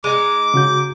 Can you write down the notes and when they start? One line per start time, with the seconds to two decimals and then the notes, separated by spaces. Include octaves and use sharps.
0.04 G#3 D#4 D6
0.54 C#3 F#4 G6